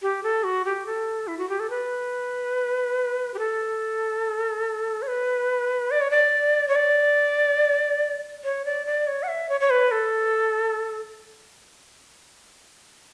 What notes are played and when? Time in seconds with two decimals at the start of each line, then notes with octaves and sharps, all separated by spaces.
0.02 G4
0.23 A4
0.44 F#4
0.65 G4
0.86 A4
1.27 E4
1.38 F#4
1.49 G4
1.60 A4
1.70 B4
3.34 G4
3.39 A4
5.02 C#5
5.07 B4
5.91 D5
6.01 C#5
6.10 D5
6.68 C#5
6.76 D5
8.44 C#5
8.65 D5
8.86 D5
9.07 C#5
9.23 F#5
9.28 E5
9.49 C#5
9.61 C#5
9.70 B4
9.91 A4